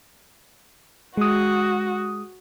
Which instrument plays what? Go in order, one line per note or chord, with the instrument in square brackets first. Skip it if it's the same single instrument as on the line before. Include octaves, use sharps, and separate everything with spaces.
[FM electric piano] G#3 D#6 [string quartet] F#4